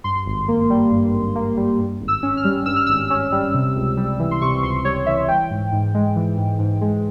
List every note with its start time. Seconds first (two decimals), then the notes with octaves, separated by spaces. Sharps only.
0.04 G2 C6
0.26 G#1
0.48 A#3
0.70 G3
0.91 G2
1.13 G#1
1.35 A#3
1.57 G3
1.79 G2
2.01 G#1
2.08 E6
2.23 C#4
2.37 F6
2.44 G3
2.66 G2 E6
2.76 F6
2.87 G#1 E6
3.10 C#4
3.32 G3
3.54 C3
3.76 C#2
3.97 G3
4.19 E3
4.31 C6
4.41 C3 C#6
4.63 C#2 C6
4.85 G3 C#5
5.06 E3 E5
5.28 E3 G5
5.50 G#2
5.72 G#2
5.94 G#3
6.16 E3
6.38 G#2
6.59 G#2
6.81 G#3